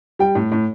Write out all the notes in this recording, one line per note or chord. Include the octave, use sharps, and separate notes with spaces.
G3 G5
A2
A2